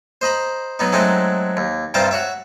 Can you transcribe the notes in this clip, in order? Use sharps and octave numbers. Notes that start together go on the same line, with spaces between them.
C5 D#5 A#5 B5
F#3 B3 D#4
F#3 G#3 A3 C4 D#4 D#5
D#2
G2 C3 F4 C5 A5 A#5
F#4 C#5 E5